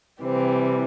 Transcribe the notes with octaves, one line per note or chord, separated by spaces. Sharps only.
C3 E3 G3 C4